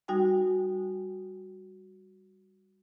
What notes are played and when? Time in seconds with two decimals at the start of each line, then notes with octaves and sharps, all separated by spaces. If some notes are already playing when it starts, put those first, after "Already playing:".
0.08 G3 D#4 F#4 G5 G#5